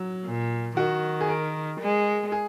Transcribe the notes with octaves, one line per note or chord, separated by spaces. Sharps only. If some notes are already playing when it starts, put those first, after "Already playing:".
Already playing: F#3
A#2
D#3 F#4
G#4
A#4
G#3
G#4